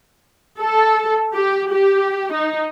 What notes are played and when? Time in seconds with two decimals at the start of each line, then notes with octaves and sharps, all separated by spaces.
0.59 A4
1.34 G4
1.71 G4
2.33 D#4